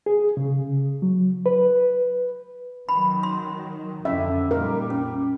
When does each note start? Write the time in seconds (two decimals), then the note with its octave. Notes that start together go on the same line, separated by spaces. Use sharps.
0.06 G#4
0.37 C#3
1.02 F#3
1.46 B4
2.89 D#3 F#3 B5
3.23 C6
4.05 F2 D3 C#4 E5
4.51 A#2 G3 A#4
4.90 C#4